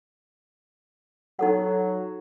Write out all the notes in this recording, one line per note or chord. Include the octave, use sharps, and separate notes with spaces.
F#3 D#4 A4 F#5